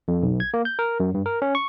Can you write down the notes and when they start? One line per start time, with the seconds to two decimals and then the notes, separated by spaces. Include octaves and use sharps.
0.08 F2
0.23 B1
0.40 G#6
0.54 A#3
0.65 G6
0.79 A#4
1.00 F#2
1.14 G2
1.26 A#4
1.42 C#4
1.55 C#6